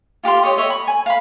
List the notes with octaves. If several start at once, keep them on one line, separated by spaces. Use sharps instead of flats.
F4 G4 F5 C6
G4 C#5 D#5
C#5 D#5 E5
B5 C#6
G#5
F5 B5